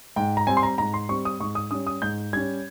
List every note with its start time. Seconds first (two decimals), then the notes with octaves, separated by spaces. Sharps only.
0.16 G#2 G5
0.37 A#5
0.47 G3 C4 G#5
0.57 C6
0.63 A#5
0.78 G#2 A#5
0.94 C6
1.09 G3 C4 C#6
1.25 D#6
1.40 G#2 C#6
1.55 D#6
1.71 G3 C#4 D#6
1.87 D#6
2.02 G#2 G6
2.33 G3 C#4 G#6